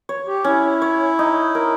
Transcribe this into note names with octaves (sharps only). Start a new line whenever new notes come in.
C#5
G4
C#4 E4
C#5
D#4
A#4